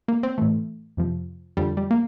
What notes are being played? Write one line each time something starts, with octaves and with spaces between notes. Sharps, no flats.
A#3
C4
A2 E3 A3
F2 C3 F3
F2 D3 F3 G3
G3
A#3